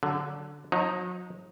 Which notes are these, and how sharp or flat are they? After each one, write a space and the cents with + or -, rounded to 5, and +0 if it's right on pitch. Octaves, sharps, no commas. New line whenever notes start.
D3 +0 F#3 +25
F#3 -40 D#4 +0